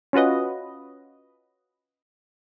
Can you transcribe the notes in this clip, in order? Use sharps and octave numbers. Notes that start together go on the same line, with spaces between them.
C#4 F4 F#4 B4 D#5